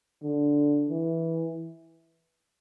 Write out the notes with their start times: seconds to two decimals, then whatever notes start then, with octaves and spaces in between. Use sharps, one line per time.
0.23 D3
0.89 E3